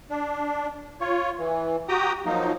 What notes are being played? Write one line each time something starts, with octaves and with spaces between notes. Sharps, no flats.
D4
F4 C#5
E3
F#4 G4 G5 A#5 D#6
F3 F#3 A#3 D#4